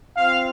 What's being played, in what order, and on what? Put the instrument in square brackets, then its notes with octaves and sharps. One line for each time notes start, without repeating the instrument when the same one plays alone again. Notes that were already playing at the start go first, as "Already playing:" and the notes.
[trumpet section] C4 F4 F5